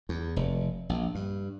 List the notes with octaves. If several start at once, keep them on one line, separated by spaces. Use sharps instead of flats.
E2
F1
A#1
G2